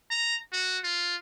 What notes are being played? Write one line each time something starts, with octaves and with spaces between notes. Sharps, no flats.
A#5
F#4
F4